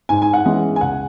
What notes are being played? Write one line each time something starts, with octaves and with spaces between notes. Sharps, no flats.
G#2 G#5
G#5
F#5
E3 G#3 C#4
G#5
C#2 F#5